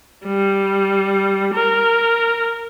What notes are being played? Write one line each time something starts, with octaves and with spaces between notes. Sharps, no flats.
G3
A#4